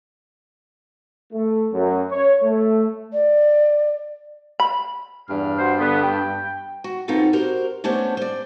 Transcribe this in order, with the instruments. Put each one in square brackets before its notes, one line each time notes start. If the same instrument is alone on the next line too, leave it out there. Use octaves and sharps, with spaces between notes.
[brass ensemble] A3
F#2
C#5
A3
[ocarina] D5
[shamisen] B5
[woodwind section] E2 F6 [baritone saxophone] G2
[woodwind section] F#4 C5
D3 B3
G5
[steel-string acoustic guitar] F#4
B3 C4 D#4 F4 F#4 A4
F#4 G4 A#4 C5
A3 B3 C#4 D4 G4 C5
C5 D5